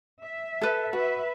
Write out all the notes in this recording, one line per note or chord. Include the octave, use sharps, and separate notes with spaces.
E5
A4 B4
F#4 B4 E5